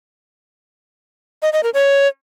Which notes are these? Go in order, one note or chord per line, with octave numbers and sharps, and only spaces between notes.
D#5
D#5
A#4
C#5